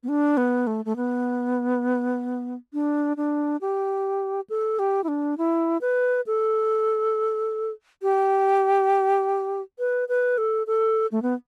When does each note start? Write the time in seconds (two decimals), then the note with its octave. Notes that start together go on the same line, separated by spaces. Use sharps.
0.03 B3
0.08 D4
0.37 B3
0.67 A3
0.85 A3
0.96 B3
2.73 D4
3.17 D4
3.61 G4
4.50 A4
4.79 G4
5.04 E4
5.08 D4
5.38 E4
5.81 B4
6.27 A4
8.02 G4
9.79 B4
10.09 B4
10.38 A4
10.67 A4
11.12 A3
11.22 B3